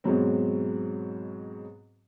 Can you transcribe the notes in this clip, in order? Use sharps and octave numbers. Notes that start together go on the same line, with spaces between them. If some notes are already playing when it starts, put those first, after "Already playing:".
G#2 B2 F#3 C4